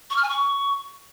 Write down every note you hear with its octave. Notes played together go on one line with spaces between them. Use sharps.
C#6
F6
G#5
C#6